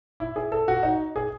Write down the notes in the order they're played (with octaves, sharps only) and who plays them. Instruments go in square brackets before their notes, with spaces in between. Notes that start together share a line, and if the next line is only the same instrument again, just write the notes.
[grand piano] E4
G#4
A4
F#4
D#4
G#4